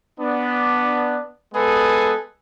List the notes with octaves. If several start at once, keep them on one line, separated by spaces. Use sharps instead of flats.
B3 D4
G#3 B3 G#4 A4 B4